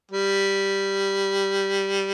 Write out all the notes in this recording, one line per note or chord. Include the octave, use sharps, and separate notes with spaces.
G3